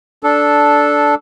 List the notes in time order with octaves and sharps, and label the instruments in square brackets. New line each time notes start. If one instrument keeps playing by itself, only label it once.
[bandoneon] D4 A4